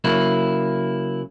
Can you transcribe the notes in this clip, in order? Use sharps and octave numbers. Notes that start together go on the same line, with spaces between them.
C#3 F#3 A#3 E4